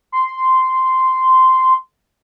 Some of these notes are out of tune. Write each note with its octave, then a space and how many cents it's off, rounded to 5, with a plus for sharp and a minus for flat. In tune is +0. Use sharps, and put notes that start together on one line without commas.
C6 -10